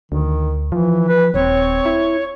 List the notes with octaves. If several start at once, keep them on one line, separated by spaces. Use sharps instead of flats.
D2 D#3
E3 F3
B4
D#1 C4 C#5
E4